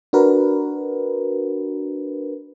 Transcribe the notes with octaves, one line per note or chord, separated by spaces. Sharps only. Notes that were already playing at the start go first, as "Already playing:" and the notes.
D4 F#4 A#4 B4